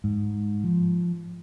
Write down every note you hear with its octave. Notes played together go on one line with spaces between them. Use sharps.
G#2
F3